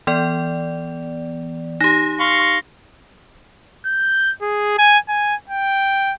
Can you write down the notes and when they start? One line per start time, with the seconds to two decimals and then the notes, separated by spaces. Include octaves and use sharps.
0.07 E3 B3 D5
1.81 D#4 G4 A#6
2.20 F5 C6 C#6
3.86 G6
4.41 G#4
4.78 G#5
5.08 G#5
5.49 G5